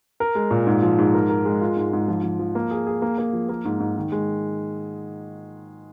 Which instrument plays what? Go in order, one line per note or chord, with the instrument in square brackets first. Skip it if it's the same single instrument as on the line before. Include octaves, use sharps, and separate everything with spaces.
[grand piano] A#4
G#3
A#2
G#2
F3
G#2
A#4
A#4
G#3
F4
G#2
G#2
F3
F3
F3
A#3
G#4
G#4
A#3
A#3
F3
A#3
G#2
G#2
D#3
G#3